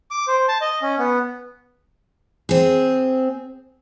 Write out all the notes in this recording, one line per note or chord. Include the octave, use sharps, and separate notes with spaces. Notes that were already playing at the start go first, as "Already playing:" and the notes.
D6
C5
A5
D#5
C#4
B3
C4 G#4